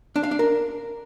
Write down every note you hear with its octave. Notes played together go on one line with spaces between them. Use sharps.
D4
F5
D4
A#4